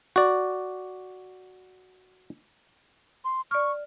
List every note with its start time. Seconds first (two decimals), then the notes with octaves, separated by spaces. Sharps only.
0.16 F#4 D5
3.25 C6
3.51 D5 C#6 F6